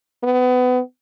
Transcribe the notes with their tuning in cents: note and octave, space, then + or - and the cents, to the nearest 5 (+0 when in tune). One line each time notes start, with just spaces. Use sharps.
B3 +25